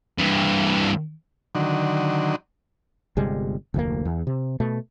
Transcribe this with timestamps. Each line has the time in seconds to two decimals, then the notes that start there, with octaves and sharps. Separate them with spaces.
0.19 G2 E3
1.55 D3 D#3 F#3
3.17 G1 C3 G3 G#3
3.74 F1 D2 A#2 A#3
4.05 E2
4.27 C3
4.60 B2 A3